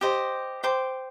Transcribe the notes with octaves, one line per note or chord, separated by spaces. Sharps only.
G4 C5 D#5
C5 G5 D6